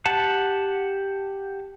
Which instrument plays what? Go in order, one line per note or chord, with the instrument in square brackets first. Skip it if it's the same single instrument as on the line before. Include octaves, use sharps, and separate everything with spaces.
[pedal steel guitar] G4 F#5 A5